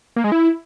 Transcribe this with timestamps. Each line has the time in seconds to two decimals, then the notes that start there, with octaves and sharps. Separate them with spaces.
0.16 A#3
0.24 G#3
0.32 E4